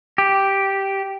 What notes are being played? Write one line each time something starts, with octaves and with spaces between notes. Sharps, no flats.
G4